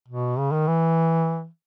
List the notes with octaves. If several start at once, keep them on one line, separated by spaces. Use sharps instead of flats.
B2
C#3
D#3
E3